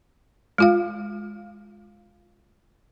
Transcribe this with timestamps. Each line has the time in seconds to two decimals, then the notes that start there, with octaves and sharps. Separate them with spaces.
0.58 G#3 F4 F5